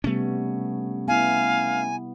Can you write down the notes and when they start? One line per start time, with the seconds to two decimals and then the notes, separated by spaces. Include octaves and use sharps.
0.04 C3 G3 A3 B3 C#4
1.08 B3 E4 F5 G#5